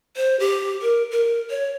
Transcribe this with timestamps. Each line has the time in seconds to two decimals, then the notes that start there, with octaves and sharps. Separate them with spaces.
0.16 C5
0.40 G4
0.82 A#4
1.11 A#4
1.50 C#5